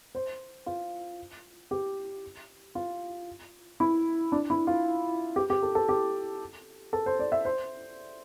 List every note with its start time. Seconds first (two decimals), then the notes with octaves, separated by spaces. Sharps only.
0.15 C5
0.66 F4
1.71 G4
2.75 F4
3.80 E4
4.32 D4
4.50 E4
4.67 F4
5.36 G4
5.50 G4
5.62 A4
5.75 A4
5.89 G4
6.93 A4
7.06 C5
7.19 D5
7.32 E5
7.45 C5